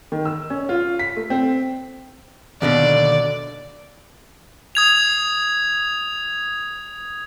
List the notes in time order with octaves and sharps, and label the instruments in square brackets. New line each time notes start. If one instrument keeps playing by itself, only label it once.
[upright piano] D#3
E6
C#4
F4
B6
A3
C4
[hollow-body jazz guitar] D#2 B2 D3 [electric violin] D5
[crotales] D#6 G#6 F7